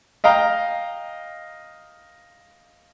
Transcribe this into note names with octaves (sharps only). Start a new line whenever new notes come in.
D#5 F5 G5 A#5